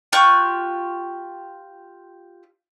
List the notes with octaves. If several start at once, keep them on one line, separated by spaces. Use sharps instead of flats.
F4 G4 C#6 F#6